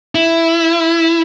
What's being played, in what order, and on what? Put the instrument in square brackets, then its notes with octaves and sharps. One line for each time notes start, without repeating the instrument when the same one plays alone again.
[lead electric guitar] E4